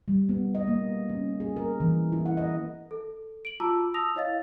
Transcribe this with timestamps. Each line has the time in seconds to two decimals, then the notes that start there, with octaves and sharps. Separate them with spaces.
0.08 G3
0.29 B3
0.55 D#5
0.68 A#3
1.09 C#4
1.40 G#4
1.56 A#4
1.80 E3
2.12 E4
2.26 F#5
2.37 D#5
2.91 A4
3.45 D7 F#7
3.60 F4 F#4 A5 A#5 D6 E6
3.94 A5 D#6 E6 A#6 F7
4.15 E4 C#5 D#5 F5 A6